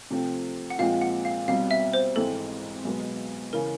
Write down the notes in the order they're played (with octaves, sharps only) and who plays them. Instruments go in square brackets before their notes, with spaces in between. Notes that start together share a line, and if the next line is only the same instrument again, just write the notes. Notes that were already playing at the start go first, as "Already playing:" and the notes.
[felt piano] C3 F3 A3 C4
[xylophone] F#5
[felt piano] A#2 F3 G#3 C4 F4 [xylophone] F5
[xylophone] F#5
F5
[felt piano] C2 B2 G3 C4 [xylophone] F5
[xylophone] E5
C5
[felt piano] G#1 G#2 E3 G#3 C4 [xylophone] A4
[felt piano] B1 B2 G#3 B3
[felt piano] C#3 E3 [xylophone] A#4